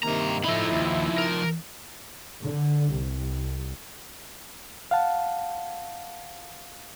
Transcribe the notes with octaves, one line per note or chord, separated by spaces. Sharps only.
G2 C3 D#3 A#3 A#5
F3 D#4 E4 A4 B5
D#2
A#4
D3
C2
F5 F#5 A5